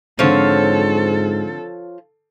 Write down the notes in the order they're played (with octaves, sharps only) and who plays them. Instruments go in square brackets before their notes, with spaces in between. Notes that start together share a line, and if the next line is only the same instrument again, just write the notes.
[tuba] G#2 [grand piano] D3 C4 [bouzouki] F3 C#5 [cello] A4